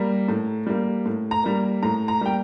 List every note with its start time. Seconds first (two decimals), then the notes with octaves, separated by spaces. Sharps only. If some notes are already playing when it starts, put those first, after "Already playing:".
Already playing: G3 A#3 A#5
0.28 A2
0.66 G3 A#3
1.06 A2
1.31 A#5
1.44 G3 A#3
1.83 A2 A#5
2.08 A#5
2.21 G3 A#3 G5